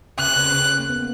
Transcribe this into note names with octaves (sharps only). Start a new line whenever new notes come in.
C#3 F#6
C#3
C#3
A#3
B3